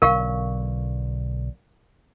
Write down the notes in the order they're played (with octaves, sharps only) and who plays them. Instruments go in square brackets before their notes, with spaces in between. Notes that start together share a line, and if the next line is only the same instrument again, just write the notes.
[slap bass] B1 D3 [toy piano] A#4 F5 C#6